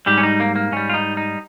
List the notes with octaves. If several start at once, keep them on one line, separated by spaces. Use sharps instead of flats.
G#2 G3 G4
C#4
D#4
A#3
A#3
G#2 G3 C#4
F4
D#4
D#4